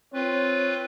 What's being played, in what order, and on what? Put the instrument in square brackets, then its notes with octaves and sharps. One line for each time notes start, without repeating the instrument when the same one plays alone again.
[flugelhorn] C4 [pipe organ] F4 B4 [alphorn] C#5